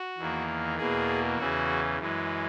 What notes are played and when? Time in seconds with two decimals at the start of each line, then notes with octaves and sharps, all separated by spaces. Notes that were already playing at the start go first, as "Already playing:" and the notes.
Already playing: F#4
0.18 E2 D#3 A#3
0.78 E2 B2 A#3 G#4
1.38 E2 C#3 E3 F#4
1.98 F#2 E3 G#3